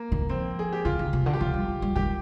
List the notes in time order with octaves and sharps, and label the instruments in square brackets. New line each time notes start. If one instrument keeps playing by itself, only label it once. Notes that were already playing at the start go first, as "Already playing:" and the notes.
Already playing: [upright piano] A#3
[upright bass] D#3
[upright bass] F3 [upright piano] C4
[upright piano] G#4
G4
[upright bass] D3 [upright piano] F4
[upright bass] D#3
C3
D3
[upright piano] G4
[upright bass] F3 [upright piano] F4
[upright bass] G3
F3
G3
[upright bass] D#3 [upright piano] G4